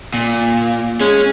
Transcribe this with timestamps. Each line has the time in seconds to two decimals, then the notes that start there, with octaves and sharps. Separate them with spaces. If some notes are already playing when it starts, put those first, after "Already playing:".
0.14 A#2
1.01 G#3 C#4